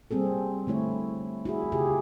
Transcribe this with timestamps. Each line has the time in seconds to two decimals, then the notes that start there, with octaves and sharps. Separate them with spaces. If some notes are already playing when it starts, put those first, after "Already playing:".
0.11 G3 A#3 C4 G#4 A4
0.67 D3 A3 E4 C#5
1.45 E4 F#4 G#4
1.72 C#3 F4 G4 G#4